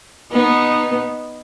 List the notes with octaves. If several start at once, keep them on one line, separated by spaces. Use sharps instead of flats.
B3 D#4